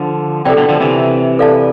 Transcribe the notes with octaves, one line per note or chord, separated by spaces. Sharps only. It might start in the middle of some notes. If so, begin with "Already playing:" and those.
Already playing: D3 F3
C3 E3 A4 D5 G5
B2 D3
D3 F3
C3 E3
A4 D5 F5 A5